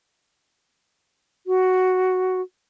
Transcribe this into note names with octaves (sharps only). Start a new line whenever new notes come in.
F#4